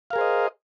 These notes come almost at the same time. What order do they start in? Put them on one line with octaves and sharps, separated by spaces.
F5 A#4 G#4 C5 D#5